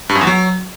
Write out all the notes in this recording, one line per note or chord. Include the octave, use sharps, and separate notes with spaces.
G2
F#2
E2
F#3